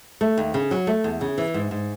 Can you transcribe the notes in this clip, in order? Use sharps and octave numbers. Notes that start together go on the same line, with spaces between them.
A3
D#2
C#3
F#3
A3
E2
C#3
E3
G#2
G#2